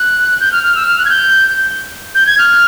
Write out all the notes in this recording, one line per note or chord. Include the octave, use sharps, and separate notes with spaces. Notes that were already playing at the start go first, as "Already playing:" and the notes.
Already playing: F#6
G6
F6
F6
E6
F6
F#6
G#6
G6
G6
G#6
F6